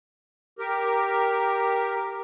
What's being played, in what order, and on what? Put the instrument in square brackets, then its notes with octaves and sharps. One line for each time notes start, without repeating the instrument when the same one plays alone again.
[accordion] G4 A#4